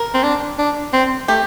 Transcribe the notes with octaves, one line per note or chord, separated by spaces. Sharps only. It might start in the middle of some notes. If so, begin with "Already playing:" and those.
Already playing: A#4
C4
D4
D4
C4
A3 G4